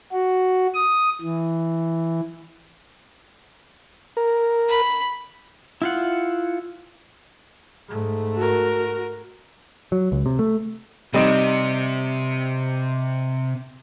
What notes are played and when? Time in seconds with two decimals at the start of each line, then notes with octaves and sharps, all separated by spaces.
0.13 F#4
0.74 D#6
1.21 E3
4.17 A#4
4.69 B5
5.82 E4 F4 F#5
7.89 G#2 A3
8.36 F#4 A#4
9.92 F#3
10.12 C#2
10.26 C3
10.39 A3
11.14 C3 G3 C4 D#4